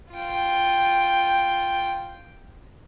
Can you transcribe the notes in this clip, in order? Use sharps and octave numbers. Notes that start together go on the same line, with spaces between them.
F4 G5